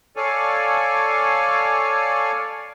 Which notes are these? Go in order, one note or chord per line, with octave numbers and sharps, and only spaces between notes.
A4 C#5 D5 F5 G#5